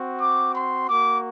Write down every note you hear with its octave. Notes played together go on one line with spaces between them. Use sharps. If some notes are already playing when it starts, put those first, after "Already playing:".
Already playing: C4 F#4
D6
C6
A#3 F#4 D6